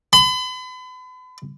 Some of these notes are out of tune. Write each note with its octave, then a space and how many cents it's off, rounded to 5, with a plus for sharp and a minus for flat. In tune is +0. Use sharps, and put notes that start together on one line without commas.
B5 +40